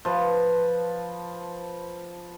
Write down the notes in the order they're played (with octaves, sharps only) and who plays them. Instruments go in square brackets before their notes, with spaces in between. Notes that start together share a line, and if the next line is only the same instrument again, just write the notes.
[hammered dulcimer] F3 B4